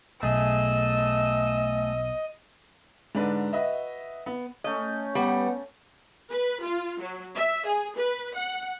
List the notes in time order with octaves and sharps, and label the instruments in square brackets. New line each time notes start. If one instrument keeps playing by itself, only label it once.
[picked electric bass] B1 [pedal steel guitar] A3 G#4 [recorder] D#5 [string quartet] E6
[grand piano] G#2 D3 D4 B4
F#4 B4 D#5 E5
B3
[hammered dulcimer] A3 C#4 [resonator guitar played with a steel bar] D#5
[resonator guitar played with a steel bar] G3 [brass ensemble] B3 [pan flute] F#5
[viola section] B4
F4
F#3
E5
G#4
B4
F#5